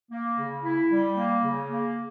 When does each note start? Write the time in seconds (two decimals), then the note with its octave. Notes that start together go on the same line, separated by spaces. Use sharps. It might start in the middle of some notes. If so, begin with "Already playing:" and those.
0.11 A#3
0.38 C#3
0.64 E4
0.91 G3
1.16 A#3
1.43 C#3
1.69 A#3